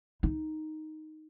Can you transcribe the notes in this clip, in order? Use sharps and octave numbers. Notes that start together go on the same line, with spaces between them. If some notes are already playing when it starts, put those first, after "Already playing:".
D#4